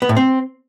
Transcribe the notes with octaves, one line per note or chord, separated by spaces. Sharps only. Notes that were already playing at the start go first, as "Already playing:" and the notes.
B3
A2
C4